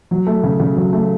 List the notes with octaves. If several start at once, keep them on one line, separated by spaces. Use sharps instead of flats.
F#3
A3
C#3
C#3
F#3
A3